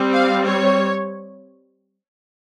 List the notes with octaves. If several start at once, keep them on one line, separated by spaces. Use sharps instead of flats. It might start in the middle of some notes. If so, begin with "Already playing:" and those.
Already playing: G3 C4
F5
C#5